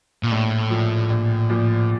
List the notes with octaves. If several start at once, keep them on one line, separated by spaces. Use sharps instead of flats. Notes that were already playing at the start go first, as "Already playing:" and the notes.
A#2
A#1 A2
A#2 F3
A#1
A#2 F3